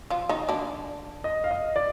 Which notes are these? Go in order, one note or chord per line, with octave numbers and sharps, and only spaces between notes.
F3 F4
D#3 D#4
D3 D4
D#5
F5
D#5
D5